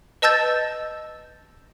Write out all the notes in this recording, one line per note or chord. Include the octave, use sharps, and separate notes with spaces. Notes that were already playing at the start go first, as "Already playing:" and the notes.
B4 D#5 A5 E6 G6 A6